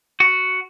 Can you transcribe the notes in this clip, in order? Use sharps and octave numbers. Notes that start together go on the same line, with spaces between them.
F#4